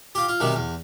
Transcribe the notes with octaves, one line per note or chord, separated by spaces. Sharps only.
F4 G4
F4
B1 C3 D#3 G3
E2